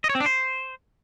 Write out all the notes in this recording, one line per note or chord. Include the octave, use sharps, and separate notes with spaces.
D#5
C#5
C4
D4
C5